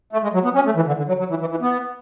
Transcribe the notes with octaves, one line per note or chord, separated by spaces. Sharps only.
A3
G#3
F#3
B3
C#4
A3
E3
D3
D3
F#3
F#3
E3
E3
E3
B3